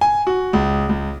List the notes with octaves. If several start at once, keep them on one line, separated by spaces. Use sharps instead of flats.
G#5
F#4
C#2
C#2